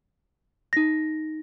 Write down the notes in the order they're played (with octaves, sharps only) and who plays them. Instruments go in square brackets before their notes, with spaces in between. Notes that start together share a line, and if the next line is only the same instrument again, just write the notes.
[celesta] D#4 A#6